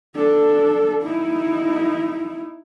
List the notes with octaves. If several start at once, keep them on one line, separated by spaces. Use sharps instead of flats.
D4 A4
D#4 E4